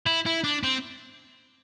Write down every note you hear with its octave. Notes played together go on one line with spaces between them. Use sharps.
E4
E4
D4
C4